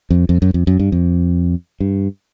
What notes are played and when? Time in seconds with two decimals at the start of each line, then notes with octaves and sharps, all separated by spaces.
0.10 F2
0.29 F2
0.42 F#2
0.54 F2
0.67 F#2
0.79 G2
0.92 F2
1.80 G2